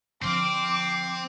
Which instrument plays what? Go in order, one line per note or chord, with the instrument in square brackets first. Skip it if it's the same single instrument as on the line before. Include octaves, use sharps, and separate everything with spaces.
[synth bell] D3 F3 [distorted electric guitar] C4 [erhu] D6